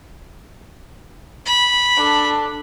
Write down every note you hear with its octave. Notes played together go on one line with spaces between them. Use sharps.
B5
D4 A4